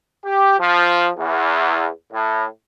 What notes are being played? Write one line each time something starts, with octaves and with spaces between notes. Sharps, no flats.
G4
F3
E2
A2